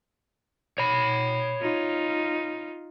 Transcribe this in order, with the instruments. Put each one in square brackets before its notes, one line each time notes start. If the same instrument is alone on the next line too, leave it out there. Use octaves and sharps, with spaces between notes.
[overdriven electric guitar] C#5 B5
[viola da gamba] D#4 F4